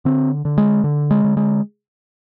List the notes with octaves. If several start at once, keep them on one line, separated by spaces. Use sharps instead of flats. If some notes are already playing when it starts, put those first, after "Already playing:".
D3 C4
D3
G#3
D3
G#3
D3
G#3